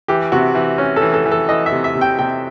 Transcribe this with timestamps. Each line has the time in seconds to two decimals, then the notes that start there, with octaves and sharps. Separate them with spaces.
0.08 E3 G4
0.32 C3 F#4
0.55 E3
0.78 C#4
0.96 A4
1.02 E3
1.14 A4
1.26 E3
1.31 A4
1.49 E3 D#5
1.66 E5
1.72 C3
1.84 E5
1.95 C3
2.01 G5
2.19 C3 G5